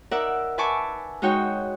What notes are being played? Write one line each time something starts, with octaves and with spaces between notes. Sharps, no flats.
D#4 A#4 D5 E5 F#5
B4 E5 G#5 A5 C#6 D6
G#3 D#4 F#4 C#5 G5